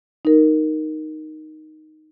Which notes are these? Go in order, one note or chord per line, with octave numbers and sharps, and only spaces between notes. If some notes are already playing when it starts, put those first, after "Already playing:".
D#4 A#4